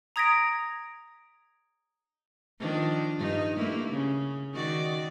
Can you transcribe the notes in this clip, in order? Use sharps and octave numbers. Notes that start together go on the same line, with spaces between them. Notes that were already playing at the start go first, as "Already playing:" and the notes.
A#5 D#6 G#6 A#6 B6 D7
D#3 F3 D4
G2 D#4
A3 A#3 E4
C#3
D#3 F#4 D5